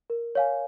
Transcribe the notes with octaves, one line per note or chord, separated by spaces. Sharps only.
A#4
C#5 F5 G#5